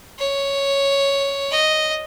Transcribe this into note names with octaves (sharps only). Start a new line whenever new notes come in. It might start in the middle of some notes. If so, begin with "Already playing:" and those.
C#5
D#5